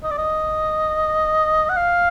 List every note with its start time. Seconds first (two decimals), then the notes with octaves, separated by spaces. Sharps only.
0.03 D#5
0.11 D5
0.18 D#5
1.69 F#5
1.76 F5